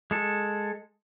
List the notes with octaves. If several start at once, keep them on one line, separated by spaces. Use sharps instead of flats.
G#3 A4